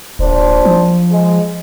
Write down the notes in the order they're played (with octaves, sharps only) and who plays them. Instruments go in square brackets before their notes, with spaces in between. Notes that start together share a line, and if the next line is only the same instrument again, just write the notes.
[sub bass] D1 [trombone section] A#1 D4 C5
[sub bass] F3
[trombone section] G#3